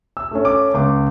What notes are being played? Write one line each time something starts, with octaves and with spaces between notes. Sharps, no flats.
E6
A3 C#4
D6
C#2 D6